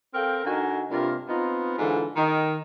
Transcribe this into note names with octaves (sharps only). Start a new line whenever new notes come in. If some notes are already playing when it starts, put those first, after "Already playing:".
C4 A4 A#4 F5 G5
D3 D#4 F#4 A#4 G#5
G2 C3 A#3 F4
B3 C4 D#4 F4
G#2 D3 E3 F4 A4
D#3